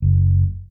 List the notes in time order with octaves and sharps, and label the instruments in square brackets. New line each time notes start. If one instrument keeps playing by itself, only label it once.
[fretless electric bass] F#1